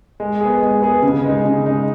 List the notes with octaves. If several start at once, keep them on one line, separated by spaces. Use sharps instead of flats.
G#3
B3 G#4
G#3
B3 G#4
C#3
G#3 D#4
C#3
G#3 D#4